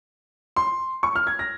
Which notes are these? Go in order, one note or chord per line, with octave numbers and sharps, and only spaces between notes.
C6
C#6
F6
G#6
A#6